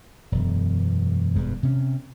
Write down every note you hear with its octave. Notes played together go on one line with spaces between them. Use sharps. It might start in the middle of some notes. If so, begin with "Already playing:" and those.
E1 F#2
E1 G2 G#3
C3 C#4